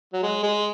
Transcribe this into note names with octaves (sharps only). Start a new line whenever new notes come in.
F#3
G#3
G#3